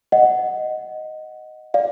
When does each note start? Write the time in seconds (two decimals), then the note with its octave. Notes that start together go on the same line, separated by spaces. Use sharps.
0.12 D#5 F#5
1.74 D5 F5